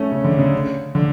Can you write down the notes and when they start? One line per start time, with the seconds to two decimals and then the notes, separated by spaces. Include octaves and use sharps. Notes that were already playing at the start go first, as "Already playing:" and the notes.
Already playing: A3 C#4
0.12 C#3
0.24 D3
0.39 C#3
0.95 D3